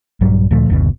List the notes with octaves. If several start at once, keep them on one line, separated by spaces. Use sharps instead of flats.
A#1 G2 F#3 G3
D2 A#2 F3 A3
F#1 D2 B2